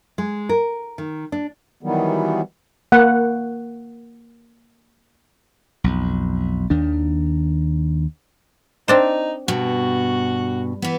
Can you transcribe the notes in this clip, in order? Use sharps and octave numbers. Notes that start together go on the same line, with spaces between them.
G#3
A#4
D#3
D4
D#3 E3 F#3 G3 B3
A#3 F#5
B1 F2
D#2 D#3 D4
C4 D4 D#4 C5
G2 B2 F#4
E3 B3